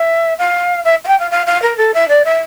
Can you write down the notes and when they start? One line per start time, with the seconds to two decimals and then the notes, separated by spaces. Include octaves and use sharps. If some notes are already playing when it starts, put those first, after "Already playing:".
Already playing: E5
0.38 F5
0.84 E5
1.04 F5
1.07 G5
1.19 F5
1.31 F5
1.46 F5
1.62 A#4
1.77 A4
1.94 E5
2.08 D5
2.25 E5